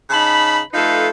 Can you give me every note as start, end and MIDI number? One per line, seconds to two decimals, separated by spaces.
0.10 0.60 49
0.10 0.60 63
0.10 0.60 81
0.10 0.60 83
0.73 1.08 53
0.73 1.08 57
0.73 1.08 63
0.73 1.08 69
0.73 1.08 71
0.73 1.08 77